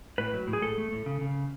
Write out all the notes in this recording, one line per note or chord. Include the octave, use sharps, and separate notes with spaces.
A2 B4
F#3
A2
G#4
A2 A4
A3
A2
C#3
C#3